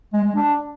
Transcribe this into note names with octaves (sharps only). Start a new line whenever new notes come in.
G#3
G#3
D4